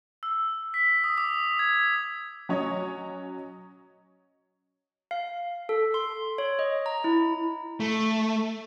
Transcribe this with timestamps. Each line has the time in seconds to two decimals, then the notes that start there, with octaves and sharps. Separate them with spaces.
0.23 E6
0.74 B6
1.04 D#6
1.18 D6
1.59 G#6
2.49 F#3 C#4 C#5 D#5
5.11 F5
5.69 A4
5.94 C6
6.38 C#5
6.59 D#5
6.86 A#5
7.04 E4
7.80 A3